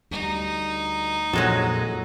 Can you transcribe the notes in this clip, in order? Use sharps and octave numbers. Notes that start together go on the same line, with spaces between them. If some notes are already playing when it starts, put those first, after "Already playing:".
D2 G3 D#4
A#1 F2 F#3 G#3 F#4 A4